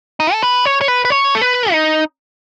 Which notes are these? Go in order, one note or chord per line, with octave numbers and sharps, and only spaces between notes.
D#4
A4
B4
C#5
C#5
B4
B4
C#5
A4
B4
D#4